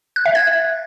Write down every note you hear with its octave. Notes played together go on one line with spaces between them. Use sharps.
F#6
E5
G#6